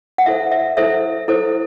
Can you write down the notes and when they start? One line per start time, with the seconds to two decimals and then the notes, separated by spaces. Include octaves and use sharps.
0.18 F#5
0.26 E4 A4 C5 E5
0.51 E5
0.77 E4 A4 C5 E5
1.28 E4 A4 C5